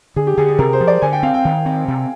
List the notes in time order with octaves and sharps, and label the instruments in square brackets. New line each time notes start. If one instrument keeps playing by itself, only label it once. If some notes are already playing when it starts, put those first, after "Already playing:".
[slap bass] D3 [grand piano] G#4
[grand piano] G4
[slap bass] D3 [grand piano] G#4
[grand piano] G#4
[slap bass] C3 [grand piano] A#4
[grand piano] C5
[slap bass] F3
[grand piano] D5
[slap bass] D3 [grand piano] G#5
[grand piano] G5
[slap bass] C4 [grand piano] F5
[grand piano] G5
[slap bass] D#3
C4
C3